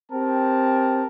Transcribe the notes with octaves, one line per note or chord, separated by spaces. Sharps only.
C4 G4 A#4 A5